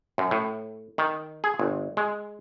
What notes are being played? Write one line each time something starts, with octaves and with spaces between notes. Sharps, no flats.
F#2
A2
D#3
G#4
G1
G#3